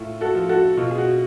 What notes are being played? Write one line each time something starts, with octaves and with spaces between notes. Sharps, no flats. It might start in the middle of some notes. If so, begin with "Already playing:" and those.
Already playing: A2 F4
F#4 A4
F3
F#4 A4
B2 F4
G#4
F#4